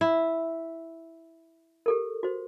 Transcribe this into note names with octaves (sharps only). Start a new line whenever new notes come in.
E4
G4 A4 A#4
F#4 C5